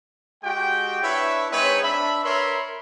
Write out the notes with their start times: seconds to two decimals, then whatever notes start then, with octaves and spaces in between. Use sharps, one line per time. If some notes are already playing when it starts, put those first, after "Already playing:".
0.44 G#3 F#4 G4 G5
1.03 D4 E4 B4 C#5 E5
1.51 G#3 C4 D#4 B4 C#5
1.83 D4 E5 B5
2.23 A#4 B4 C#5 E5 B5 C6